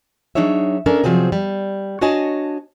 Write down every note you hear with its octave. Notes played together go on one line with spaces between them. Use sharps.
F#3 D4 D#4 G#4 C#5 E5
C#4 D4 A4 A#4
C3 F3 F#3 C4 G#4
G3
D4 F#4 C#5 D#5 G#5 A5